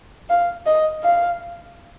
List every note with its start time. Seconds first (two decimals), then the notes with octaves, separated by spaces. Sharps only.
0.30 F5
0.66 D#5
1.03 F5